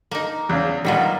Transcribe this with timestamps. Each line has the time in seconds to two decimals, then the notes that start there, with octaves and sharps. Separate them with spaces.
0.11 A#3 D#4
0.49 E2 C#3
0.85 A#2 D#3 F#3 G3 B3